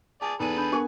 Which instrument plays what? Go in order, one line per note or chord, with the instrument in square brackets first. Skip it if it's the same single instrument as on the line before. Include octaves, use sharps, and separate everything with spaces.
[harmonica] G#4 D5 [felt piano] A5
[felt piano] E2 D#7 [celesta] D#4 [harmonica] G#4 A4 B4
[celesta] D4 B5 G6
[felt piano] B3 G#5 C#6 [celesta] D4 A#4